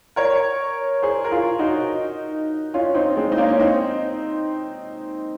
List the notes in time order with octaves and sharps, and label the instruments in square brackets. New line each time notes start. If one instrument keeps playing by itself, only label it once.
[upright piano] A#4 C#5
G#4 C5
A#4
F4 G#4
D#4 F#4
C#4 F4
C4 D#4
G#3 C4
D#4
A#3 C#4
C#4
C4 D#4